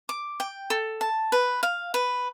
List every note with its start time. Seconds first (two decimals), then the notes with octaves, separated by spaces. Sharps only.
0.09 D6
0.40 G5
0.70 A4
1.01 A5
1.32 B4
1.63 F5
1.94 B4